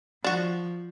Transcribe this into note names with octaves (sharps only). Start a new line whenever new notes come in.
F3 D4 F#4